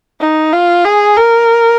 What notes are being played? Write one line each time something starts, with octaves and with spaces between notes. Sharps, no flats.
D#4
F4
G#4
A#4